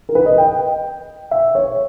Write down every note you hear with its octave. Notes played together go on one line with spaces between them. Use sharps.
A#4
B4
D#5
G5
E5
C#5